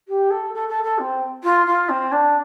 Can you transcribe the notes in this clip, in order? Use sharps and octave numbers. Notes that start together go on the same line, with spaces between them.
G4
A4
A4
A4
A4
C4
F4
F4
C4
D4